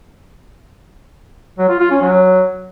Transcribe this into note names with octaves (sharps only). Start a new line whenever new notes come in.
F#3
F4
F4
C#4
F#3